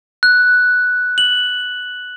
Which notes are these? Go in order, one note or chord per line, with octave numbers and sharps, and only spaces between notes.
F#6
F#7